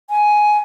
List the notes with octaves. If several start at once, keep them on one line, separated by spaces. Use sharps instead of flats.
G#5